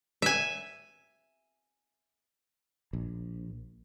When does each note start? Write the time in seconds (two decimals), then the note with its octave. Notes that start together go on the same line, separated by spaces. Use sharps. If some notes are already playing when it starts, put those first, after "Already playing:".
0.22 E5 G#5
2.93 A#1